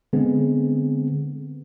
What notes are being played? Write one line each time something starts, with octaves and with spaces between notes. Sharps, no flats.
D3 G#3 B3 C4 G#4